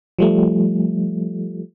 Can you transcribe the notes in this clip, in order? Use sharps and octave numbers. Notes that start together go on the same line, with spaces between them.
F3 G3 A3